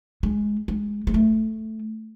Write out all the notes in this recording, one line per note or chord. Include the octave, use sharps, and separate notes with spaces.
G#3
G#3
G#3
A3